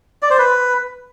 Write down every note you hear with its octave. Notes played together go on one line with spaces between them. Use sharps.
D5
C5
B4